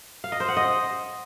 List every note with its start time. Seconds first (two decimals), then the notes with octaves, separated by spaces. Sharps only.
0.24 F5
0.32 D#5
0.40 C5
0.48 F#5
0.57 D#5